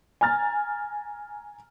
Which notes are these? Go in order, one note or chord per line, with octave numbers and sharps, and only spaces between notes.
G#5 A#5 F6 A6